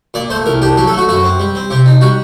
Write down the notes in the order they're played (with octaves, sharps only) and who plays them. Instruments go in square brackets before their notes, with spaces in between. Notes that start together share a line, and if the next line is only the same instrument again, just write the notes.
[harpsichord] A#2 D5
A3 C5
C2 A#4
D4 G4
F#3 G4
A4
A3
F#4
F#2 F#4
C4
G3
C4
C3 G4
D#4
G3 F#4